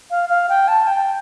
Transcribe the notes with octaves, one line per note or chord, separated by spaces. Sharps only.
F5
F5
G5
A5
G5